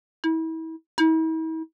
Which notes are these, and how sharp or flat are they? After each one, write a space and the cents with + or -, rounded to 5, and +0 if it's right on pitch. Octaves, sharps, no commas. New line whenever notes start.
E4 -35
E4 -45